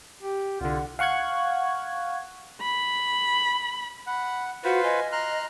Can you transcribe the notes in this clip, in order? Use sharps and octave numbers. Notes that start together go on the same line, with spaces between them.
G4
C2 D3 F4 F#5
F5 F#5 C#6 F#6 G#6
B5
F#5 B5
F4 F#4 B4 C5 F#5
D#5 G#5
A#5 C6 F6 F#6